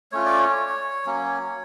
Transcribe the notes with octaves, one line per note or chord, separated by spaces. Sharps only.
A3 C#4 F4 C#5
D5
C#5
F#3 A#3 C#4